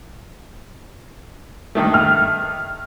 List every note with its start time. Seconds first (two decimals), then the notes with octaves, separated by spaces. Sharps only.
1.75 G2 D#3 A3
1.94 F6